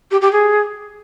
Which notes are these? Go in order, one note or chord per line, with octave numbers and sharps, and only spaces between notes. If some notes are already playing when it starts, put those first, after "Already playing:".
G4
G4
G#4